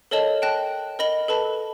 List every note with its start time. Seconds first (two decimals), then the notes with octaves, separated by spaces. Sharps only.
0.11 A4 A#4 C#5 D#5 A5 F#7
0.42 G5 A5 F#6 A#6
0.99 A#4 D#5 B5 A#6 F#7 G7
1.28 A4 B4 A5 B5